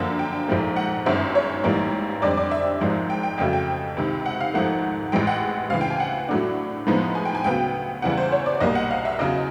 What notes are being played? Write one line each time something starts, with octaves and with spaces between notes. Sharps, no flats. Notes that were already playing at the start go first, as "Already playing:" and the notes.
Already playing: F#2 D3 F3 A#3 F#5
G5
G5
A#1 G#2 F3 A3
F#5
G1 F#2 D#3 G#3 C#4 E5
C#5
A1 G#2 E3 G3 A#3
F2 D3 G3 C4 D5
D5
E5
G#1 G#2 F3 G#3
G5
G5
F2 C#3 F#3 A3 G5
G5
C#2 C3 D#3
F#5
F5
G#1 G#2 F3 A3 F#5
A1 A2 E3 G#3 G5
F#5
D2 C#3 E3 F5
G5
G#5
F#5
A2 F#3 A3 D4
A2 F3 G#3 B3 D#4
G#5
G5
G#5
D2 C#3 F#3 B3 G5
E2 C#3 E3 G3 F#5
C5
C#5
D5
B1 A#2 G3 A#3 D#5
F#5
F5
E5
E2 C#3 F#3 D#5